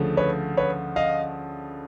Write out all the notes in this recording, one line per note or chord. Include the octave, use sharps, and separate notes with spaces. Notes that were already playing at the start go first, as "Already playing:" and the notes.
Already playing: D2 C#3 F3 A3
B4 C#5
B4 C#5
D#5 F5